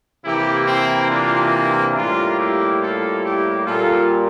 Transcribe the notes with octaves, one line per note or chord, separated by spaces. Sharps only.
C3 E3 A#3 E4 G4
C4 E4
D4 F4
D4
A2 G3 A#3 D4 F4
E4 G4
F4 A4
E4 G4
A#2 G3 A#3 F4 A4